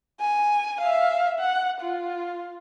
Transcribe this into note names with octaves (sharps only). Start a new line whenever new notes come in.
G#5
E5 F5
F#5
F4